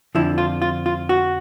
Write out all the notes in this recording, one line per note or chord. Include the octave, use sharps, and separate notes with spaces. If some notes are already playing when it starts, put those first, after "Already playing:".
F2 D3 F3 E4
F4
F4
F4
F#4